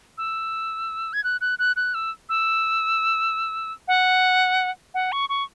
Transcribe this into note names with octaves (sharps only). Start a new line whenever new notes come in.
E6
G#6
F#6
F#6
F#6
F#6
E6
E6
F#5
F#5
C#6
C#6